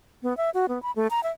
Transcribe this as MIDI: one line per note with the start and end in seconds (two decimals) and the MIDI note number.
0.23 0.36 59
0.37 0.50 76
0.54 0.66 66
0.69 0.81 59
0.83 0.91 83
0.96 1.07 57
1.11 1.23 82
1.23 1.31 76